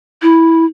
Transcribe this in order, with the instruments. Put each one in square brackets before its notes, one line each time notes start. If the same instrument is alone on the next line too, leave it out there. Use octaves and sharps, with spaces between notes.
[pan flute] E4